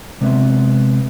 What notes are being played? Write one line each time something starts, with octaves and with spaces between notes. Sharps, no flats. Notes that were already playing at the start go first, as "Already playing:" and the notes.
C3 G#3 A3 B3 C4 E5